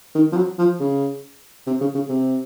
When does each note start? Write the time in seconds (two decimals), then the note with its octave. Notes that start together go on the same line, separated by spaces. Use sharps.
0.15 D#3
0.32 F3
0.37 F#3
0.58 F3
0.80 C#3
1.67 C3
1.81 C#3
1.95 C#3
2.09 C3